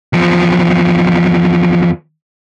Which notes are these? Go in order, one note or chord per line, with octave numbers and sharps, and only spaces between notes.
E2 F3